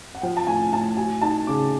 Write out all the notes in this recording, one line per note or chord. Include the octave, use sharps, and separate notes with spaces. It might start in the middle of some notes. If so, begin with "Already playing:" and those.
F#5
F3 G5
A5
A2 G#5
A2 A5
F#3 G#5
D#4 A5
C#3 D6